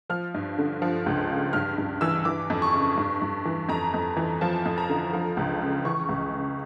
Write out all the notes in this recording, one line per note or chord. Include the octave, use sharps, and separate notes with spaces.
F3 F6
G2
D3
F3
C#2
C#3
G2 F6
G2
E3 E6
E3 D6
F2
C#6
C#3
G2
G2
E3
F2 A#5
F2
E3
F3 A5
F2
A#5
D3
F3
C#2
C#3
E3 C#6
C#2
C#3